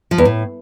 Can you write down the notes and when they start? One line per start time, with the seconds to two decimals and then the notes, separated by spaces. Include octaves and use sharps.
0.11 F3
0.18 E2
0.25 A2